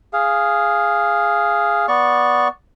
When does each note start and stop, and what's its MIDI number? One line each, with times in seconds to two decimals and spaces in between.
0.13 1.86 68
0.13 1.86 77
1.88 2.48 59
1.88 2.48 74
1.88 2.48 85